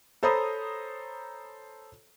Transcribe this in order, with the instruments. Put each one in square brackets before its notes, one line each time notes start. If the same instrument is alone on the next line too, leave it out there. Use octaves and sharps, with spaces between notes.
[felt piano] A4 C5 C#5 A#5 B5 D#6